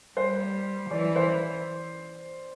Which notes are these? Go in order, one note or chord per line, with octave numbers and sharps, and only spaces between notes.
G3 C5
E3 D5
C5